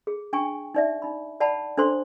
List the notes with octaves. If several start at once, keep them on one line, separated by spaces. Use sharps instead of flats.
G#4
D4 G5 G#5 C#6
D#4 D5 E5
D#4 B5
D5 F#5 A5 B5
D4 A4 C5 C6